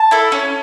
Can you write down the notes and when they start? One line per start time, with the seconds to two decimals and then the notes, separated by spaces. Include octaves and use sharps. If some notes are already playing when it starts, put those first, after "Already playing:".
Already playing: A5
0.11 E4 A4
0.32 C#4